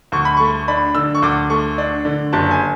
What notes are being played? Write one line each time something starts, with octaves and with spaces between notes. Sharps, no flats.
D2 C#6
B5
A3 C#6
D4 B5
D3 E6
C#6
D2 D6
A3 C#6
D4
D3
F#1 A5
G#5